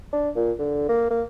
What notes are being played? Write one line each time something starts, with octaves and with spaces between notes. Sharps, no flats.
D4
A#2
D3
A#3
A#3